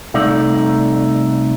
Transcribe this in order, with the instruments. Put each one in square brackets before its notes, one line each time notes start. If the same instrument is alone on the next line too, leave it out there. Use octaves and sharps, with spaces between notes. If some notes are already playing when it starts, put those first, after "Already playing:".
[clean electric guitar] C2 A3 D#4 D5